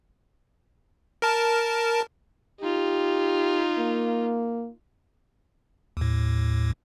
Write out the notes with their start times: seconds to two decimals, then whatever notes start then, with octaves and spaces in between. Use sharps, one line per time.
1.22 A#4 A5
2.61 D#4 F4 G4
3.78 A#3
5.97 D#2 A2